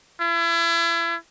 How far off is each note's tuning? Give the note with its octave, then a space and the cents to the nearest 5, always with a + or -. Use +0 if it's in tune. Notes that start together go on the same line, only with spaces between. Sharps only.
E4 +35